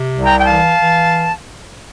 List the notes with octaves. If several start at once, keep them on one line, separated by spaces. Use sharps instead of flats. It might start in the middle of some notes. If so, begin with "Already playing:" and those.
Already playing: C3
C2
G5 A#5
G5
E3 F5 A5
E3